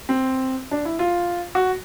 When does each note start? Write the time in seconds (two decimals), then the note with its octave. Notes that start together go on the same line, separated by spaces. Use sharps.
0.09 C4
0.71 D4
0.85 E4
0.99 F4
1.55 F#4